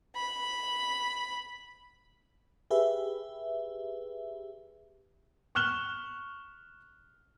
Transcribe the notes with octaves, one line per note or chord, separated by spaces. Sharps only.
B5
G4 G#4 B4 E5
C#6 F6 F#6 E7 G7